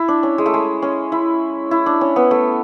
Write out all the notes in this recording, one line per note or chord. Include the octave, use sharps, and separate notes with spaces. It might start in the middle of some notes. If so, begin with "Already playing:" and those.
Already playing: E4
D4
C#4
G#3
A3
G#3
C#4
E4
E4
D4
C#4
B3
A3